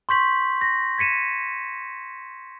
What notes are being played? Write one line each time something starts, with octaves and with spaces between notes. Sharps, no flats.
C6 C#6 G6 B6 F#7
A#6
G#6 B6 C#7 D#7 E7